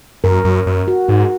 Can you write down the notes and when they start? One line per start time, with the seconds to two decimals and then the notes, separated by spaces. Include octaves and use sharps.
0.24 F#2 A#4
0.45 F#2
0.67 F#2
0.88 F#4
1.08 G#2 F#4